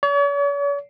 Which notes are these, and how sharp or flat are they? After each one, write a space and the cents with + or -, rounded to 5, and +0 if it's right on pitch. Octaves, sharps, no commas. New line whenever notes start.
C#5 +45